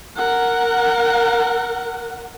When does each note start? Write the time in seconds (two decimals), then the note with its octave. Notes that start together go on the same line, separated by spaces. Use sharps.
0.16 A#4 F#5